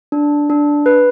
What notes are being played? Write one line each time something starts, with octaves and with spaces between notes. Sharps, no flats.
D4
D4
B4